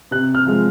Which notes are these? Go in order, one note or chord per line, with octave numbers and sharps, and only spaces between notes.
C3 F#6
F6
F3 G#3